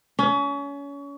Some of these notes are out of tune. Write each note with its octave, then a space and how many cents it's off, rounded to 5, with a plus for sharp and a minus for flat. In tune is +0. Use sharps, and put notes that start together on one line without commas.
C#4 +30